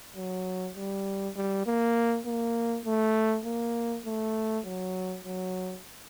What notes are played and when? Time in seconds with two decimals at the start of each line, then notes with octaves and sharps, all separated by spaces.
0.16 F#3
0.76 G3
1.35 G3
1.66 A#3
2.26 A#3
2.85 A3
3.45 A#3
4.05 A3
4.65 F#3
5.24 F#3